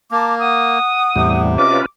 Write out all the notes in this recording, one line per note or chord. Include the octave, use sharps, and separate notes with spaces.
A#3 A5 A#5 D6
F#5 D#6
E2 A2 C3 G3
C#4 F4 F#4 B4 D#5 D6